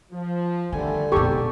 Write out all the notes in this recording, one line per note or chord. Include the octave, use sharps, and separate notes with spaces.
F3
D3 D#3 G3 A3 G#5
F1 G#2 B2 G4 A4 C#6